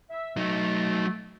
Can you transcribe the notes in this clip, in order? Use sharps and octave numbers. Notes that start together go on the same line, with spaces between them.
E5
F#3 A3 D#4